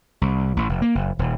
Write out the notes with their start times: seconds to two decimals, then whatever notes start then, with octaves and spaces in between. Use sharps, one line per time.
0.21 C2
0.57 A1
0.69 F1
0.82 A#3
0.95 F#1
1.19 D#1